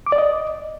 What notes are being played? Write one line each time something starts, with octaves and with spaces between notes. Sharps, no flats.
D6
D5
D#5